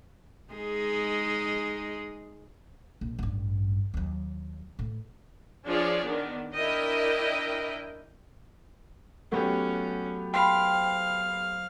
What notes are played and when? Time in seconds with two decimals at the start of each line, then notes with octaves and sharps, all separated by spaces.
0.53 G#3 D#4 G#4
3.01 A#1
3.19 A1 G2
3.94 D#2 F#3
4.79 A2
5.66 F3 D4 F4 G#4 C#5 D5
6.01 D#3 B3 D4
6.53 D4 E4 A#4 D#5 G5
9.32 F#3 A3 B3 C#4 G4
10.34 C5 F5 G5 B5